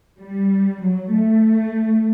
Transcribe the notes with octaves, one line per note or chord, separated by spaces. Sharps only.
G3
F#3
A3